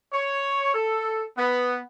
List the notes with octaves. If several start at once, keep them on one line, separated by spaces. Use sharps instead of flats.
C#5
A4
B3